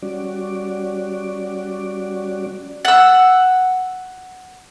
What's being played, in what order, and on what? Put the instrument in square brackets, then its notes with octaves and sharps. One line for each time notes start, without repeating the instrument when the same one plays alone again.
[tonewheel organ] G3 C#4 F#4 D5
[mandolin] F#5 E6